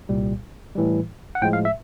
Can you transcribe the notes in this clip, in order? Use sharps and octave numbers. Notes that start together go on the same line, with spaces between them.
C2 A#2 G3
A2 E3 G3
F#5
A2 F3 G#3 G5
F5
E5